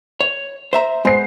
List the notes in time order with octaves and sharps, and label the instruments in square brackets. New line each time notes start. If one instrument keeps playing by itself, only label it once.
[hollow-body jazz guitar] C#5
C5 E5 A#5
[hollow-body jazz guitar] G#3 B3 [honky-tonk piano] C5 C7